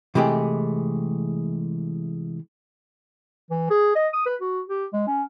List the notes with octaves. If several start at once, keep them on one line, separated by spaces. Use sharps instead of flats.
C3 E3 G#3 A3 G4 G#4
E3
G#4
D#5
D#6
B4
F#4
G4
G#3
C#4